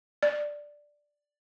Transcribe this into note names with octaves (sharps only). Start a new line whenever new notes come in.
D5